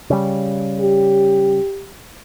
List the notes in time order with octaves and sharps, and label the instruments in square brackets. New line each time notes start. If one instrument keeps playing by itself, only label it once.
[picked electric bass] C#3 G3
[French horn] G4